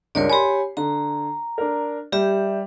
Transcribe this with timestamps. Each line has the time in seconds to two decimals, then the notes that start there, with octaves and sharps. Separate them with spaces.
0.15 C#2 G2 A#4 C#5 D5
0.29 G4 C#5 G#5 B5 C6
0.77 D3 A#5
1.58 D4 A#4
2.12 G3 G4 E5